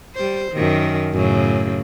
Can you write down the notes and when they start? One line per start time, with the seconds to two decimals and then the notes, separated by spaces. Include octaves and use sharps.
0.15 G3 C5
0.53 F#2 D#3
1.13 F#2 A2 C#3